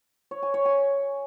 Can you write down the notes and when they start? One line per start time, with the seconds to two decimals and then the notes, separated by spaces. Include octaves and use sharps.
0.31 C#5
0.43 G#5
0.54 C#5
0.65 G#5